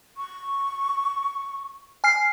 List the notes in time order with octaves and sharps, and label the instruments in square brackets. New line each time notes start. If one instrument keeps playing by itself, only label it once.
[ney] C#6
[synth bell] G#5 F6 C7